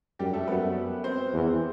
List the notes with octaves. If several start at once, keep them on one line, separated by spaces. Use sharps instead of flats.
F#2 G3 G4
A3 A4
F#2 B3 B4
C4 C5
E2